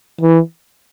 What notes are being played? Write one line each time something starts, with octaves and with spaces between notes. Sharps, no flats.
E3